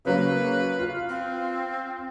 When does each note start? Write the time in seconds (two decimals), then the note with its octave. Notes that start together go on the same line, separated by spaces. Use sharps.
0.05 C#3 F#3 A#3 B4
0.79 F4 F5
1.09 C4